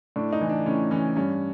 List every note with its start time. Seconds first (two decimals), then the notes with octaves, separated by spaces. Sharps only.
0.16 A2 D4
0.33 D#4
0.41 E3
0.49 D4
0.66 A2 C#4
0.91 E3 C#4
1.16 G2 C#4